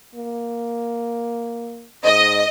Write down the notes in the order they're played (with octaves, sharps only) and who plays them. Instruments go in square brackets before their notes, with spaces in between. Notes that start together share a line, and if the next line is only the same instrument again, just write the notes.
[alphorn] A#3
[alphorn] G#2 [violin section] D#5